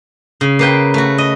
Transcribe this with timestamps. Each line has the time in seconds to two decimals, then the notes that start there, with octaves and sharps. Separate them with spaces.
0.41 C#3
0.59 A#3 B4 G5
0.94 A3 F#4
1.18 D#5